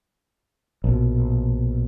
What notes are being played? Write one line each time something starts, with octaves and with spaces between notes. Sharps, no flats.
A#1 B2